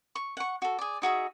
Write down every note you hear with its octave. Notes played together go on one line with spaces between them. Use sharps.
C#6
F#5 C#6
F#4 A4
G#4 D5
D#4 F#4 G#4 E5